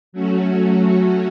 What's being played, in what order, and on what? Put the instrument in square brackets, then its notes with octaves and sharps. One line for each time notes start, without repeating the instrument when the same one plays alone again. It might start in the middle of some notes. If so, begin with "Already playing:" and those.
[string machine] F#3 A3 C#4 F#4